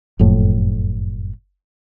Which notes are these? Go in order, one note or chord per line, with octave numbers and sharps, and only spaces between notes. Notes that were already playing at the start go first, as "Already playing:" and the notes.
F#1 F2 A2